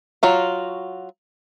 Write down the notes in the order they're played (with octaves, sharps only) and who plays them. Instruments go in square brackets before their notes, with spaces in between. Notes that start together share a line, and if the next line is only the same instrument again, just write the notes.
[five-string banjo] F#3 F4 F#4